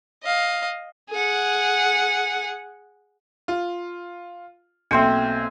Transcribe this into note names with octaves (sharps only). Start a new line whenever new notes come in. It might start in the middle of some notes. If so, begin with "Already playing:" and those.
D#5 F5
G#4 F#5
F4
B1 A#3 C4 A4 C5 E5 G#5